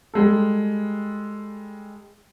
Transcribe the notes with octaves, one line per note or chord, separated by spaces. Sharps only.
G3 G#3 A4